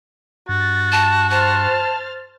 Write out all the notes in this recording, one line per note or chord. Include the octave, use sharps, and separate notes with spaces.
G2 F#4 A6
A5
C5 A5 F6 A6